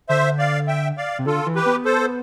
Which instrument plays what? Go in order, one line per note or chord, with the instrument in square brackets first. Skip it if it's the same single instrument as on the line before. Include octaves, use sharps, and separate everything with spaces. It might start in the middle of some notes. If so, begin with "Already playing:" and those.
[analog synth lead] D3 [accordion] C5 E5
[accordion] D5 F5
E5 G5
D5 F5
[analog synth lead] C3
[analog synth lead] D3 [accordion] F4 A4
[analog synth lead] E3
[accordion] G4 B4
[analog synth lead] B3
[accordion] A4 C5